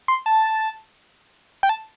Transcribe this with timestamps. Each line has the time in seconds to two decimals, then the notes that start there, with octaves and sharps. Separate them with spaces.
0.08 C6
0.26 A5
1.63 G5
1.69 A5